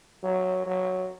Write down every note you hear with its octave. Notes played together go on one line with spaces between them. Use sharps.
F#3
F#3